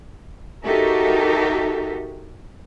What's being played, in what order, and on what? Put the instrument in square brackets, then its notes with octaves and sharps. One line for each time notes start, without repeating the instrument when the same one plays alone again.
[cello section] D#4 F#4 G4 A4 A#4 E5